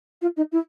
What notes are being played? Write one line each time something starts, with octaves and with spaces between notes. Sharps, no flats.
F4
D#4
E4